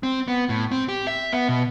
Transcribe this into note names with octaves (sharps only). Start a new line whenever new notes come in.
C4
B3
A2
C4
G4
E5
B3
B2